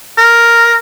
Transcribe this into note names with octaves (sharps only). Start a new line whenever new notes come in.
A#4